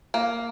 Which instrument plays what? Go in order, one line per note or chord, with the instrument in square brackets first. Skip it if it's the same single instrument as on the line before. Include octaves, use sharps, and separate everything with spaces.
[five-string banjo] A#3